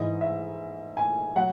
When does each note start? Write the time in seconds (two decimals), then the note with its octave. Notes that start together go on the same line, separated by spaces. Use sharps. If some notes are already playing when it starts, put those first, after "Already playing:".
Already playing: G#2 E3 D#5
0.21 E5
0.97 G#5
1.36 F#3 F#5